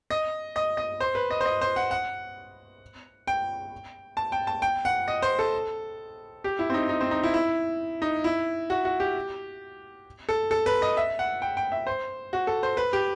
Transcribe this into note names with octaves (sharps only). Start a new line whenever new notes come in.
D#5
D#5
D#5
C5
B4
D#5
C5
D#5
C5
F#5
F#5
G5
A5
G5
A5
G5
F#5
D#5
C5
A4
G4
E4
C4
D#4
D#4
C4
D#4
E4
E4
D#4
E4
F#4
F#4
G4
A4
A4
B4
D#5
E5
F#5
G5
G5
E5
C5
F#4
A4
C5
B4
G4